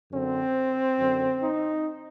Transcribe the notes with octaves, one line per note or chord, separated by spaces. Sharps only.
F#2 D3 C4
F#2 D3
D#4